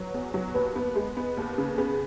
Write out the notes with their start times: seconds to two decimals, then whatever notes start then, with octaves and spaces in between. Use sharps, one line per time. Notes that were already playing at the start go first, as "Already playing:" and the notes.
Already playing: F#3 B4 C#5
0.14 E2
0.34 F#3
0.55 D#2 B4
0.76 B3
0.95 G#3
1.17 B3
1.37 D#2
1.58 C#3
1.78 B3 G#4